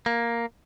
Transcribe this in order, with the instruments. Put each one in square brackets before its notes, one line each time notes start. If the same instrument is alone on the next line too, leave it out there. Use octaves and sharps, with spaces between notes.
[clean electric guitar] A#3